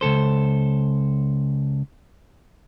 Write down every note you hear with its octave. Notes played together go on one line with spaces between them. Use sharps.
C#2 G#2 A4 C5